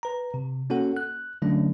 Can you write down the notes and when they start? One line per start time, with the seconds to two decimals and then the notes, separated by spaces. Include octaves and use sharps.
0.03 B4 A#5
0.34 C3
0.70 A#3 C#4 F#4 A4 F#5
0.97 F#6
1.42 D3 F#3 A3 C#4 D4